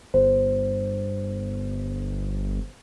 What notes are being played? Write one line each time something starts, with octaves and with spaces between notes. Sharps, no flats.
G1 C5